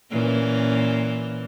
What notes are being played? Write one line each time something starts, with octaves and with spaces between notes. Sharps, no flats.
A#2 E3 C#4